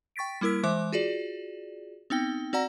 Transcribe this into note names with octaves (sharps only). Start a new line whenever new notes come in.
G5 C#6 A6 B6 D7
G3 A#3 E4 A#4 E6 B6
E3 G#3 C5 E5 D6
F4 F#4 G#4 D5
B3 C4 D#4 G5 G7
C4 F#4 D5 F#5 A#5 A#6